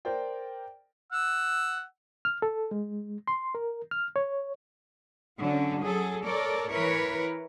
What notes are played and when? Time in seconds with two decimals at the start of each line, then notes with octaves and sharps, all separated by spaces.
0.05 A#4 C5 D5 G5
1.12 F#5 E6
2.25 F6
2.42 A4
2.71 G#3
3.28 C6
3.55 A#4
3.91 F6
4.16 C#5
5.40 D3 F#3 C#4
5.85 F#3 G#4 A4
6.26 A4 A#4 C#5 D5
6.73 E3 E4 A#4 B4 C#5